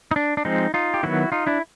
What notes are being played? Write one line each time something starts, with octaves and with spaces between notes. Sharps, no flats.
D#4
D4
D4
F3 G#3 C4 D#4
D#4 F4
G4
D#3 F#3 B3 E4 F#4
D#4 F4
D4 E4